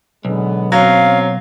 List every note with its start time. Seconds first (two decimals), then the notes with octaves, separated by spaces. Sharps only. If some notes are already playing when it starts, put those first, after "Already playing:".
0.25 B1 D3 G#3 B3
0.72 F#3 C4 C#4 C#5 F5